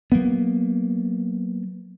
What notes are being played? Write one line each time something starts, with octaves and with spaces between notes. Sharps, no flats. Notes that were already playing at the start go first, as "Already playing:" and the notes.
F#3 A#3 B3